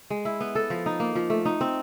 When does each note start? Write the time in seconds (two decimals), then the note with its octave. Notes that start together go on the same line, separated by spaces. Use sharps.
0.10 G#3
0.25 E4
0.40 B3
0.55 A4
0.70 F3
0.86 D#4
1.00 A#3
1.15 F3
1.30 A3
1.45 D#4
1.61 C4